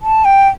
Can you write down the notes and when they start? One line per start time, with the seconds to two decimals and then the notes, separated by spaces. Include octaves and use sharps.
0.02 A5
0.25 G5